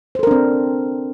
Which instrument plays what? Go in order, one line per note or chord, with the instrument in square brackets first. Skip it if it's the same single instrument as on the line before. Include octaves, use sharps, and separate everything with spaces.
[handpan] C5
A4
A#4
D4
C4